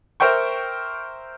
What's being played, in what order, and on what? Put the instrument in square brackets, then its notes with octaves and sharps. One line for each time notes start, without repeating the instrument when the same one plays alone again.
[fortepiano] A#4 C5 E5 G5 C#6